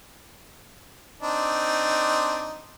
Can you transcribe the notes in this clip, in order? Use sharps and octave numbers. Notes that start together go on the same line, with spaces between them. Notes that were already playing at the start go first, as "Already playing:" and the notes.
C4 D4 D#4